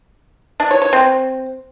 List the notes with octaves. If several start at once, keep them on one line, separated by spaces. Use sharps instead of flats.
D4
C#5
C#5
C4